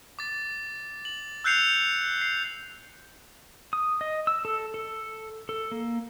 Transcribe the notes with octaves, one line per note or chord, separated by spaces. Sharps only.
D6 A6
F#7
E6 F#6 G6 C7 C#7 F7
C7
D#6
D#5
E6
A4
A4
A4
A#3